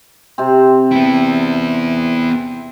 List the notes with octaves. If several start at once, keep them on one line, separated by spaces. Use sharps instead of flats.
C3 C4
B3 E4